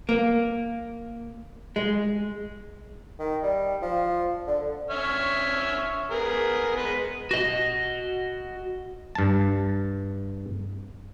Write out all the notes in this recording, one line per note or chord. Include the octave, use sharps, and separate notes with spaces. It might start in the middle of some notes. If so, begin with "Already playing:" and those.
A#3
G#3
D#3
G3
F3
D3
C#5 E5 F6
B3 G#4 A#4
G#3 B3 B4
F#4 D#5
G2 A5